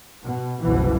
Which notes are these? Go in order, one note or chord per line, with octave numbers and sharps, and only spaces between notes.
B2
F#1 C2 B2 E3